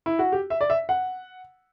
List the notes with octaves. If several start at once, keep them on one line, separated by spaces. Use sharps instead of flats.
E4
F#4
G4
E5
D5
E5
F#5